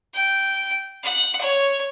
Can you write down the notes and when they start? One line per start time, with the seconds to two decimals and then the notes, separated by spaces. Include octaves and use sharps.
0.15 G5
1.03 F#5
1.41 C#5